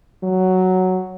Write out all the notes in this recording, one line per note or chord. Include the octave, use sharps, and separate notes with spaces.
F#3